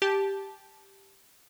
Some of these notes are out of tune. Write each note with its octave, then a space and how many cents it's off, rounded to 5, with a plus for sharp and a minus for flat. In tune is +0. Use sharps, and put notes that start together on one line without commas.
G4 +0 A5 -15